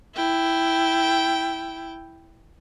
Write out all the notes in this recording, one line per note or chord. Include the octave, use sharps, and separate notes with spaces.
E4 G5